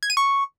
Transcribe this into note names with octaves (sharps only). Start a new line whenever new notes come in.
G#6
D#7
C#6